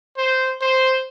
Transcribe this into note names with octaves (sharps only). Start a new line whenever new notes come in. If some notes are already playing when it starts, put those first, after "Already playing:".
C5
C5